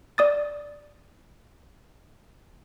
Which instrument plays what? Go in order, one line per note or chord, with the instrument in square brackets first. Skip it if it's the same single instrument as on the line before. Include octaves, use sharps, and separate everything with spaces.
[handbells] D5 D#6 A6